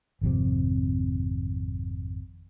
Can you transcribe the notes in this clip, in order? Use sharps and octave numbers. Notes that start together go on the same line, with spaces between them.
G#1 F2 C3